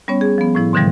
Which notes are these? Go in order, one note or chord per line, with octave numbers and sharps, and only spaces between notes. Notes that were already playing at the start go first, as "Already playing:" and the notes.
G3 B3 C#4 C#5
G#4
F3 B3
A2 F3 E4
G#2 B2 D3 E3 F3 G3